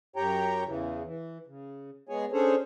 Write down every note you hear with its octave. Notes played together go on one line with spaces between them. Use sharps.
F#2 G4 C#5 G5 A#5
E2 C#3 E3
E3
C#3
G#3 B3 G#4 C#5 G#5
C#4 D4 G#4 A4 C5 C#5